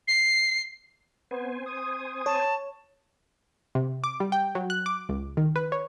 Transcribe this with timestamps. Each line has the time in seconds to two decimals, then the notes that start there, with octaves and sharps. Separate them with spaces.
0.08 C7
1.31 B3 C4 C5 G#5
1.66 D#6
2.26 C#5 A5
3.75 C3
4.04 D6
4.20 G3
4.32 G5
4.55 F#3
4.70 F#6
4.86 D6
5.09 C#2
5.37 D#3
5.56 B4
5.72 C#5